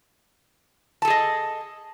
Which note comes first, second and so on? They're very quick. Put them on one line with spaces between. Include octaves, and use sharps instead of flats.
A5 A4 G#4 D#5